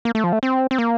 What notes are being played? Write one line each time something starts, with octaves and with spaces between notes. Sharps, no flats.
A#3
A3
F3
A3
C4
C4
A#3